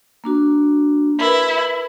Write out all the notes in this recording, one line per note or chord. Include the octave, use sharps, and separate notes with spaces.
A#3 D4 F#4
E4 A#4 B4